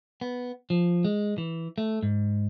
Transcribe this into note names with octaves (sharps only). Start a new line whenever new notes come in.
B3
F3
G#3
E3
A3
G#2